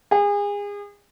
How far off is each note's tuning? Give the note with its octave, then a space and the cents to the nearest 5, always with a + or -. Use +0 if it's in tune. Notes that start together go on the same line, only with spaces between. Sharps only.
G#4 -30